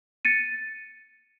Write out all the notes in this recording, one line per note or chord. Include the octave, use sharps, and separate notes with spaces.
A6 C#7 D#7